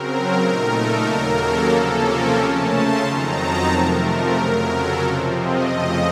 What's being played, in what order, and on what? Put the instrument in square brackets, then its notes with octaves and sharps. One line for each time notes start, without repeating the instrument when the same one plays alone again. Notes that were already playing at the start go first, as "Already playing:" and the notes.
Already playing: [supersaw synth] C#3 F#3 C4 A#4
A#2 A3 D#4
A4
D#2 C#3 F#3 A#3 A#4
A4
C3 F3 A#3 C#4
A#4
C#3 A3 C#4 A5
C6
F2 D#3 F#3 C4 D#4 A#5
A5
C3 F3 A3 A#4
F2 C#3 F#3
A4
C3 F3 C4
D#5
F2 C#3 F3 A3